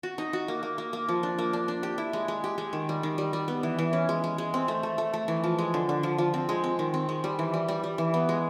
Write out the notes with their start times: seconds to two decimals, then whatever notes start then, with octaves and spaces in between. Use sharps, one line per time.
0.03 F#4
0.18 D#4
0.33 F#4
0.48 A#3
0.63 A#3
0.78 A#3
0.93 A#3
1.09 F3
1.23 D4
1.38 A#3
1.53 D4
1.68 D4
1.83 G4
1.98 E4
2.13 G#3
2.28 G#3
2.44 G4
2.58 G#3
2.73 D#3
2.89 G3
3.03 D#3
3.18 G3
3.33 G3
3.48 B3
3.63 E3
3.79 E3
3.93 C#4
4.09 G#3
4.24 G#3
4.38 G#3
4.54 C4
4.68 A3
4.83 A3
4.98 A3
5.14 A3
5.28 E3
5.44 F3
5.59 G#3
5.74 D3
5.89 D3
6.03 F3
6.18 F3
6.34 C4
6.49 G#3
6.64 C4
6.79 D#3
6.94 C4
7.09 G#3
7.24 G3
7.39 E3
7.54 G3
7.68 G3
7.84 G3
7.98 E3
8.14 B3
8.29 G#3